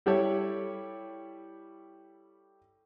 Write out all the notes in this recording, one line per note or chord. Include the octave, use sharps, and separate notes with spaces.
G3 E4 G4 A4 C#5